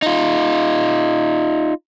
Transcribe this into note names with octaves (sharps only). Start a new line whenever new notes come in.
D#4 F4